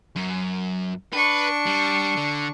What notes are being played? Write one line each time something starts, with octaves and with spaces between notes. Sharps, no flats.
F#2
D4 B4 C#6
G3
D3